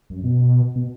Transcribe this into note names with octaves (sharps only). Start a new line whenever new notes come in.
F#2
B2
B2